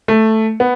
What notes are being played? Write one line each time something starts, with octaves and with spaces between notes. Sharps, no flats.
A3
B3